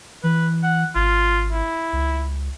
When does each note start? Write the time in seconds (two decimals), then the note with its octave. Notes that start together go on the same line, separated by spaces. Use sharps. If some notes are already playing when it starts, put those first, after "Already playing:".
0.24 E3 B4
0.63 F#5
0.95 G#1 F4
1.52 E4
1.93 C#2